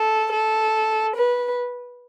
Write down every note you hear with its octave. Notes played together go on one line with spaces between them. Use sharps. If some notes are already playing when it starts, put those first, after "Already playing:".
Already playing: A4
A4
B4